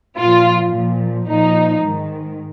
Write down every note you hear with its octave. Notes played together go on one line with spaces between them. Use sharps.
A#2 F3 F4
A#2 F3
A#2 F3 D#4
G#2
D#3